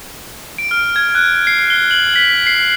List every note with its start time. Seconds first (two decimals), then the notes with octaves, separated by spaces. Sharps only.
0.58 D7
0.71 F6
0.96 G#6
1.15 F#6
1.47 C7
1.70 G7
1.91 F#7
2.16 B6
2.47 C7